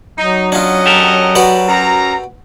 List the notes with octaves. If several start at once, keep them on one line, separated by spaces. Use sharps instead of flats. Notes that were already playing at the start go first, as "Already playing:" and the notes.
F#3 D#4
C#4 D4 F4 D#5 F#5
G4 A4 A#4
F#4 B4 D5
F#2 A#5